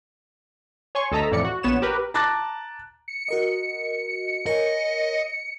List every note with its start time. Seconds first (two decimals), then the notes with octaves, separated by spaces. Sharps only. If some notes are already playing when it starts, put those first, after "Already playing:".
0.95 C#5 G#5 C6 C#6
1.12 D2 A4 D#5 A5 A#5 B6
1.31 F2 A2 E3 D5 C#7
1.45 F#4
1.63 A#1 B3 C#5 E7
1.82 G4 A#4 B4
2.14 A5 A#5 D6 F#6 A6
3.08 C#7
3.28 F#4 A#4 D#5
4.46 A#4 C#5 D#5 G#5